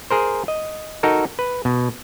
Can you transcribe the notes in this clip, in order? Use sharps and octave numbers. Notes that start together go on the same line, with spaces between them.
G#4 A#4 C5
D#5
D#4 F#4 A4 A#4
B4
B2